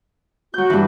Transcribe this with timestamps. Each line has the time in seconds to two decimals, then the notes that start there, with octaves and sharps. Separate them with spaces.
0.54 F#3 F#4 G6
0.70 G2 E3